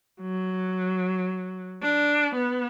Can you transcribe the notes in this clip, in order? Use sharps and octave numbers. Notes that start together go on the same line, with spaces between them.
F#3
D4
B3